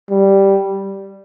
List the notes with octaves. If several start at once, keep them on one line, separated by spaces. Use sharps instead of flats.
G3